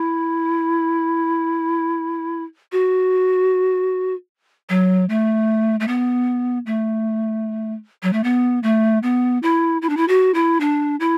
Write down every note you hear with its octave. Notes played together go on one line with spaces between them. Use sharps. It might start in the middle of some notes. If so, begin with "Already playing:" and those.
Already playing: E4
F#4
F#3
A3
A3
B3
A3
F#3
A3
B3
A3
B3
E4
E4
D4
E4
F#4
E4
D4
E4